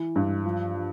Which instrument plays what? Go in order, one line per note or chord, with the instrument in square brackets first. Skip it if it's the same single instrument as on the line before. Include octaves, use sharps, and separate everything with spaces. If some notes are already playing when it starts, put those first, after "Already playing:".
Already playing: [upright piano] E3
G2
F3
F3